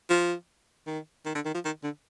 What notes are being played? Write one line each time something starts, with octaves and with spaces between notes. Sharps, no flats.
F3
D#3
D#3
D3
D#3
F3
D#3
D3